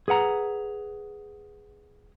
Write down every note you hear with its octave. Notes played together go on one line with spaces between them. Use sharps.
G#4 B4 F#5 A#5